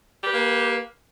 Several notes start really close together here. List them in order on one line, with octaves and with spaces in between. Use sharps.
G4 B4 A#3